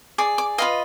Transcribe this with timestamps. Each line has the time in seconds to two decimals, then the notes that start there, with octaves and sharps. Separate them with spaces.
0.18 G#4 D5 D6
0.38 D6
0.58 F4 B4 D#5 F5